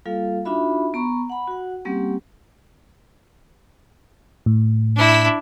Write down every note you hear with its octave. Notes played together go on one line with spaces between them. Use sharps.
G3 A#3 F4 A4 F5
D4 D#4 F4 F#4 E5 B5
B3 A#5 C#6
F#5 B5
F#4 F#5
G3 A#3 C4 C#4 G4 F#5
A2
D4 E4